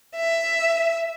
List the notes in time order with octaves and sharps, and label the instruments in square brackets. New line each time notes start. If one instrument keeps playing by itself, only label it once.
[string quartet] E5